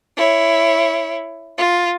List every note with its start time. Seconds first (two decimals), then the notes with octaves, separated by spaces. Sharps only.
0.17 E4 C#5
1.58 F4